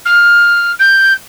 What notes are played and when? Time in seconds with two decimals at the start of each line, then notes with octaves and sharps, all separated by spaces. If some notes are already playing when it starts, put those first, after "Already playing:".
0.05 F6
0.79 G6